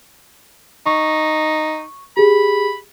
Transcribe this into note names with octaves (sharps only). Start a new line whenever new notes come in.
D#4 C#6
G4 G#4 B5